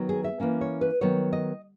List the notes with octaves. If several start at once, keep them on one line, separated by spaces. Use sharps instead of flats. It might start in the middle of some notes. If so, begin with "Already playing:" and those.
Already playing: D#3 F#3 B3
G#4
E5
E3 A#3 C#4
C#5
B4
D#3 F#3 B3 C#5
D#5